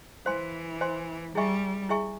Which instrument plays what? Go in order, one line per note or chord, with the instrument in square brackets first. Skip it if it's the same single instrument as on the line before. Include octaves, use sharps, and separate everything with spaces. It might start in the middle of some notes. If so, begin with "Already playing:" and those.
[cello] E3 [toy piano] C5 F5 G#5 C6
[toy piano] C5 F5 G#5 C6
[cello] G3 [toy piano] E4 G#4 E5 G#5 C#6
[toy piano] E4 G#4 E5 G#5 C#6